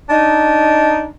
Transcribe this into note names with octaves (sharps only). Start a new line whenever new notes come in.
D4 D#4